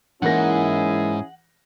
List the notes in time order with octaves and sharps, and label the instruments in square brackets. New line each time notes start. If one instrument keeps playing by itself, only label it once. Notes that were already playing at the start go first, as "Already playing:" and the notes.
[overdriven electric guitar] G#2 [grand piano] E3 A#3 A#6 [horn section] C#4 E4 G#4 [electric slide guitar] F#5